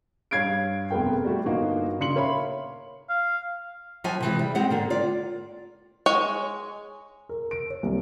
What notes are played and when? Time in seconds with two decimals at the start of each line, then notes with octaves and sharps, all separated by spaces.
0.31 G2 C#5 F5 G#6 C7 D7
0.91 F1 B3 G#4 A#4 G5
1.24 G3 A3 F#4 G4
1.46 G1 A#3 D#4 F#4 F5
1.99 C#3 A#3 D4 C6 C#7 F#7
2.16 A#4 C#5 E5 F5 B5 C6
3.09 F5
4.04 F3 F#3 F#4 E5 G#5
4.21 C3 E3 G#3
4.39 G3
4.55 G#3 C4 G4 F#5
4.70 G#2 D3 A#3
4.90 F4 D5
6.06 G#3 C#5 G#5
7.29 A#4
7.51 D7
7.70 C#5
7.83 C2